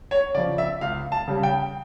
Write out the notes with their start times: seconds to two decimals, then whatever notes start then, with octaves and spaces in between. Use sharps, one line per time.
0.11 C#5
0.35 C#3 D5
0.37 F3
0.58 E5
0.81 C#2 F5
1.12 A5
1.28 C#3 G3
1.43 G5